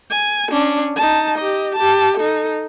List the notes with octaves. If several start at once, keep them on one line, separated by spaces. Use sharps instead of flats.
G#5
C#4 D4
D#4 A5
G4 D#5
G4 A5
D#4 A4